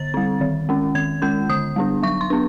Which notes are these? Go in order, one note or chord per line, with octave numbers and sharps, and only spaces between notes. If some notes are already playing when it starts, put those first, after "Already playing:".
Already playing: D3 A6
G3 C4
D#3
G#3 C#4
D#3 G#6
G#3 C#4 G6
D3 D#6
G3 B3 D4
F#3 C#6
C6
B3 D4